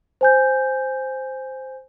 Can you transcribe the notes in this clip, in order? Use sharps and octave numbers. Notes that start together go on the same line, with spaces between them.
C5 G#5 G6